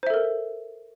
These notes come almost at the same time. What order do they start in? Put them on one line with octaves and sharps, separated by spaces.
C5 E5 A4 A#4